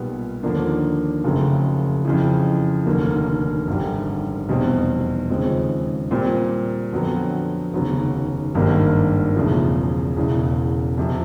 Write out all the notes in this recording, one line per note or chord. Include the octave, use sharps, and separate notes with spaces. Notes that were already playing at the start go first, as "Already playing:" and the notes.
Already playing: B1 A#2 G3 B3
D#2 D3 F3 A#3 D4
F#1 F2 C#3 F#3 A3
F2 C#3 E3
F1 D#2 D3 F#3 A#3
G#1 F#2 D3 G3
F1 E2 B2 G3 C4
D#2 C#3 F3 G#3 C4
A#2 G3 C4
F2 D3 F#3 B3
F1 D#2 C#3 F#3 B3
G#1 G2 D#3 G3 A#3
E1 E2 C#3 F3 A3
E1 E2 C#3 E3
F2 C3 F3